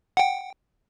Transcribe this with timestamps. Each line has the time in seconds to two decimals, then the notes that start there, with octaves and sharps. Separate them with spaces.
0.17 F#5 G5